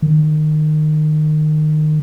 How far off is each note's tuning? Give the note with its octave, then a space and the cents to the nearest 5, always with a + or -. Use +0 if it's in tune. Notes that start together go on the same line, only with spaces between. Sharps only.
D#3 -25